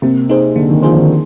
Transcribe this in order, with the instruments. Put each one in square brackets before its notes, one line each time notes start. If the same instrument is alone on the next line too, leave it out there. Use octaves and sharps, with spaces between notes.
[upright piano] C3 [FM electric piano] A#3
[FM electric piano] D#4 G#4 C5
[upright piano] D3 [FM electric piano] A#3
[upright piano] D#3
[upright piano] F3 [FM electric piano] D#4 G#4 C5
[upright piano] D3
D#3